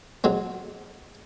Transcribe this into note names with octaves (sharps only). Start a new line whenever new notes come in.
F#3 G#3 C4